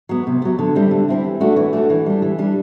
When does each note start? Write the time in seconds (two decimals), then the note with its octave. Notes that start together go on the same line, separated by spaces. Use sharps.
0.09 F#3 B3
0.27 C3
0.42 F#3 B3
0.59 D3
0.75 G3 C4 E4
0.91 D3
1.08 G3 C4 E4
1.24 E3
1.41 A3 D4 F#4
1.56 E3
1.73 A3 D4 F#4
1.90 E3
2.06 G3 D4
2.22 E3
2.39 G3 D4